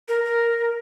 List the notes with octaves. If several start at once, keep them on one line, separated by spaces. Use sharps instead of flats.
A#4
A#4